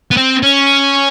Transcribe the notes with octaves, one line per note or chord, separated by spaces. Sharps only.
B3
C4
C#4